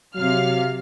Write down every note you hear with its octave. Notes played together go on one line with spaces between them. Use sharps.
C3 F#3 F5 F6